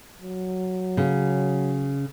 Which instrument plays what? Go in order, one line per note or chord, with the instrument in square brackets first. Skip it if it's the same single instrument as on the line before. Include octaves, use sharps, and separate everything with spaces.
[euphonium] F#3
[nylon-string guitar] C#3